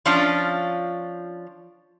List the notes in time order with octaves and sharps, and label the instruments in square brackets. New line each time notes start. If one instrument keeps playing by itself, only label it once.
[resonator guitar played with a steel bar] F3 C#4 D4 F4